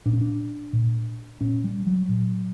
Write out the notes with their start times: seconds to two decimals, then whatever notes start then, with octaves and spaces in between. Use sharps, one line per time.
0.06 A#2 D4
0.13 C#4
0.21 D4
0.73 A#2
1.41 A#2 C#4
1.64 G3
1.87 F#3
2.09 A#2